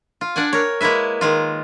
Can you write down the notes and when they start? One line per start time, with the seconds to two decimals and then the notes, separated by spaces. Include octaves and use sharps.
0.21 F4
0.36 D4 D5 F#5 G#5
0.53 A#4 C#5
0.81 G#3 A#3 E4 B4 E5
1.21 D#3 G#3 F4